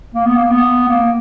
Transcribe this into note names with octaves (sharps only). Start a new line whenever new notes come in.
A#3
B3
A#3
B3
A#3